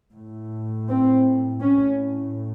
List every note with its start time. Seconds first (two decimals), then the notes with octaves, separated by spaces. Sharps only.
0.14 A2
0.88 C4
1.61 A2 C#4